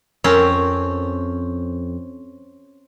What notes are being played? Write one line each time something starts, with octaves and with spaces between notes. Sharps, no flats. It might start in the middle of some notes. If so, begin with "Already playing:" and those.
F2 C4 C#4 A#4